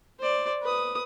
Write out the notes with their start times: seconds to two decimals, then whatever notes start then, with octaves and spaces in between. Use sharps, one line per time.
0.19 C5 D5
0.62 B4 D#6